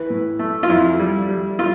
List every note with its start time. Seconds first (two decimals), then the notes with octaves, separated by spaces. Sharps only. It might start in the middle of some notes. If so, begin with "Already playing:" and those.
Already playing: E3 B4
0.10 A2
0.39 A3
0.63 F4
0.69 F2 E4
0.99 G3
1.29 G3
1.59 G3 F4